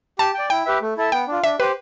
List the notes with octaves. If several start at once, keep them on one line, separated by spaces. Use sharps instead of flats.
G4 A5
D5 G5
E4 G5
G4 B4 E5
A3
E4 A4 E5 A5
B3 G5
D4 F4
D4 E5
G4 B4 C5